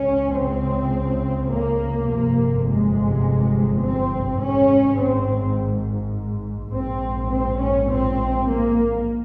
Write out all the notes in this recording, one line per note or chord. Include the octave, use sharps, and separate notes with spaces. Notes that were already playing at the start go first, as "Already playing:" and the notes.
Already playing: C#2 C#3 C#4
C4
A#3
G1 F2 C3 A#3
G#3
C4
G#1 G#2 C#4
C4
A#1 G#2 C4
C4
C#4
C4
A#3